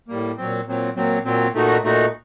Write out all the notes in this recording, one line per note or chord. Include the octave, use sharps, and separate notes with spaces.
A2 G3 A#3
A#2 F#3 C4
A#2 F#3 C4
A#2 F#3 C4
A#2 F#3 C4
A#2 A3 D#4 F#4
A#2 A3 D#4 F#4